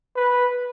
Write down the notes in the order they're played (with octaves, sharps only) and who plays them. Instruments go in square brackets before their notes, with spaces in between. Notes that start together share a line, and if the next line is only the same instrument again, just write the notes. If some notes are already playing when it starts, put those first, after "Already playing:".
[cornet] B4